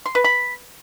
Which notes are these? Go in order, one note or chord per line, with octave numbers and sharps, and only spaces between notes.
C6
B4
B5